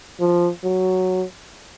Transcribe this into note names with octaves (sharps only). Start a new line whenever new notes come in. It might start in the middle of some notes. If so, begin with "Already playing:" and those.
F3
F#3